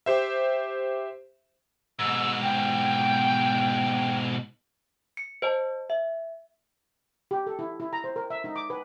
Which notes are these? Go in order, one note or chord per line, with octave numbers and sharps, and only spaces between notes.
G4 C5 E5
G#2 B2 E6
G5
C#7
C5 D#5 A5
E5
G4
A4
E4
E4
A#5
C5
A#4
E5
D#4
D6
B4